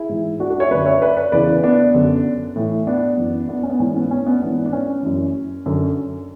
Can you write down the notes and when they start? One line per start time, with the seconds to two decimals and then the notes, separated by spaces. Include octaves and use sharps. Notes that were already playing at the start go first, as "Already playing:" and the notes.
Already playing: E4 G#4
0.09 G#2 E3
0.40 D4 F#4
0.50 D4 F#4
0.60 C#5 E5
0.70 F#2 D3 B4 D5
0.85 C#5 E5
1.02 B4 D5
1.17 B4 D5
1.32 E2 C#3 E3 B4 D5
1.63 B3 D4
1.94 F#2 D3
2.56 A2 E3
2.87 B3 D4
3.17 F#2 E3
3.49 B3 D4
3.63 C#4
3.70 B3 D4
3.80 G#2 E3 C#4
3.96 B3
4.11 C#4
4.26 B3 D4
4.41 G#2 E3 B3 D4
4.66 D4
4.73 C#4
5.03 F#2 E3
5.66 F#2 D3